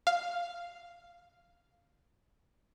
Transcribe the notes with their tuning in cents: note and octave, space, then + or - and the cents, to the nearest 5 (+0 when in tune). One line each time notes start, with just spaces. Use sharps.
F5 -5